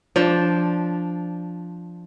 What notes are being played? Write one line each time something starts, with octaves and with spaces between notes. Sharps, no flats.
F3 D4